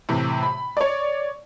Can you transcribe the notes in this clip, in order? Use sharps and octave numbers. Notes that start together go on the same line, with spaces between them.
A2 C3 E3
B5
C#5 D5